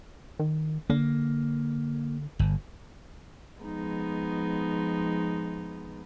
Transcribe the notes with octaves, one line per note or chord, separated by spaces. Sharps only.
D#3
D3 A#3
G1
F3 G#3 B3 D#4